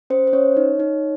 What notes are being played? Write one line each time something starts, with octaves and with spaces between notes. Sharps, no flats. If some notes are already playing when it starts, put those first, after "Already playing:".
C#4 C5
C5
C#4 C#5
D#4
D#4